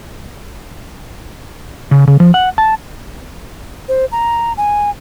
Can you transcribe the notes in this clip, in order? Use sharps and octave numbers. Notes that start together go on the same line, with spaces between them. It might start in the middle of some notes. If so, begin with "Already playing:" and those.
C#3
C#3
F3
F#5
A5
C5
A#5
G#5